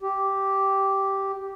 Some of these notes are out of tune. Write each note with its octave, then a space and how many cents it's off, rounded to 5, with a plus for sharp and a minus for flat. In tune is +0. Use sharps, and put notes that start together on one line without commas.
G4 -5